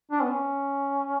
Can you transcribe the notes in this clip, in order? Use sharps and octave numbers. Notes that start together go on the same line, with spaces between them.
D4
B3
C#4